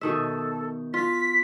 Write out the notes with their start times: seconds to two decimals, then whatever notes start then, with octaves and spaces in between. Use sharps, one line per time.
0.01 B2 D#3 A4 E5
0.94 F4 B6